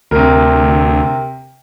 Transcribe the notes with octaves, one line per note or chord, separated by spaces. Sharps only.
D2 C3 A#4